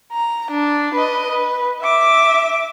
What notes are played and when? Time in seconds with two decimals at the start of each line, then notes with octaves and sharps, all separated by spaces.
0.13 A#5
0.51 D4
0.94 B4 D#5
1.31 B4
1.82 E5 D6